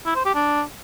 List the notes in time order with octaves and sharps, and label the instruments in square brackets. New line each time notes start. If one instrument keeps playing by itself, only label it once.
[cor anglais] E4
C5
G4
D4